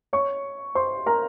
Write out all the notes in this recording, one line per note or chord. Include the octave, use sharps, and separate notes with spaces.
C#5 C#6
C5 C6
A#4 A#5